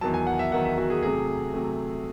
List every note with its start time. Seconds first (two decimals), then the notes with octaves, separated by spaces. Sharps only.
0.01 E2 D#3 F#3 A5
0.14 G#5
0.27 F#5
0.39 E5
0.52 E2 D#3 F#3 F#5
0.65 E5
0.78 F#4
0.90 G#4
1.03 C3 F#3 A3 G#4
1.54 C3 F#3 A3